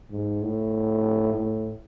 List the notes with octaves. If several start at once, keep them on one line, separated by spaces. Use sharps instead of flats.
G#2
A2
A2